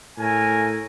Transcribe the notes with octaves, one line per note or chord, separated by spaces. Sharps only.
A2 A3 A#4 G#5